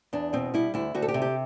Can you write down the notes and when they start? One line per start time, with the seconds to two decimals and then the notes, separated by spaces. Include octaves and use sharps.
0.13 E2 D4
0.33 B2 C4
0.54 G3 E4
0.74 D2 E4
0.95 D2 F#4
1.02 A4
1.08 G4
1.14 C3
1.22 G4